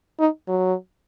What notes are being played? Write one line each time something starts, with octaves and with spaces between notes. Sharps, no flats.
D#4
F#3